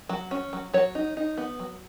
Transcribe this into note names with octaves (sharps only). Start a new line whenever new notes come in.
F#3
C#4
F#3
F#3 C#5
D#4
D#4
B3
F#3